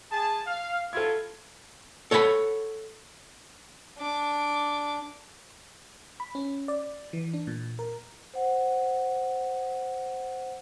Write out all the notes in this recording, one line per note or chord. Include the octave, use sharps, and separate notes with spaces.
G#4 A5
F5
F#3 E4 F4 A4 G#6
A4 C#5 F#5 G5 B5
D4 D6
B5
C#4
D5
E3
D4
A#2
A#4
C5 F#5